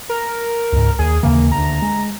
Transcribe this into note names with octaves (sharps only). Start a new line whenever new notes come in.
A#4
C#2 G#2
D#2 G#4
D#2 C#3 E3 A#3
D2 D3 A#5
G#3